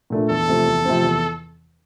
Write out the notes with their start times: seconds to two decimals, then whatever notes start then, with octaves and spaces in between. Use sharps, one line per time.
0.10 A#2 A3 D4
0.30 E2 A4
0.48 C3 F3 A3 C4
0.66 E2
0.85 C3 F3 A3 C4
1.04 E2